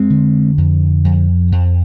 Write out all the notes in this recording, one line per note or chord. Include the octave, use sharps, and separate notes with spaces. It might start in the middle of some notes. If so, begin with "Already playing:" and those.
Already playing: F2 G#3 C4
D3
F2
F2
F2